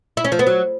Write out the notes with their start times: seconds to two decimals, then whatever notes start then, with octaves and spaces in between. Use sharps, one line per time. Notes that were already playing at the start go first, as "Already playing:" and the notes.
0.17 E4
0.25 C#4
0.32 F3
0.39 B3
0.47 F#3